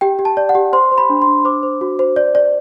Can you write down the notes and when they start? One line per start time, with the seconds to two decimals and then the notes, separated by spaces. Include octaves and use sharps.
0.01 G4 G5
0.19 G4
0.25 A5
0.37 D5
0.49 F#5
0.55 G4
0.73 C5 C6
0.91 C5
0.98 B5
1.10 D4
1.22 C6
1.27 D4
1.45 C5 D6
1.63 C5
1.81 F#4
1.99 C5
2.16 D5
2.35 D5